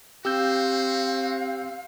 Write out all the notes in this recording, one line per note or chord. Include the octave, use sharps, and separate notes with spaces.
C4 F#4 G4 F5 E6 G6